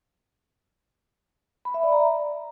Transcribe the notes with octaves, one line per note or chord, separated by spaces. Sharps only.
B5
E5
D5
A#5